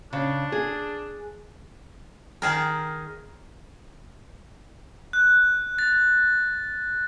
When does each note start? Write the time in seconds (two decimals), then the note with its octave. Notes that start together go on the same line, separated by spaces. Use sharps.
0.13 C#3 D4
0.52 G#4
2.42 D#3 G#4 A#4
5.13 F#6
5.79 A6